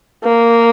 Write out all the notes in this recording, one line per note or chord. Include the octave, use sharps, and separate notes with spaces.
A#3